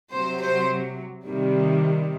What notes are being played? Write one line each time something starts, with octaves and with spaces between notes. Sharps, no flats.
C3 F#3 C5
C5
C3 D#3 G3